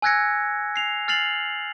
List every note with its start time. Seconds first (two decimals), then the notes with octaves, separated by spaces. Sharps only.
0.02 G#5 E6 F#6 G#6 A#6 C#7
0.76 C7 F7
1.08 F6 A6 C7 F7 F#7